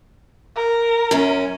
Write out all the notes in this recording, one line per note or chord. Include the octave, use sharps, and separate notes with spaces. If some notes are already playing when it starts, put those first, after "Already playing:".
A#4
F#2 C#4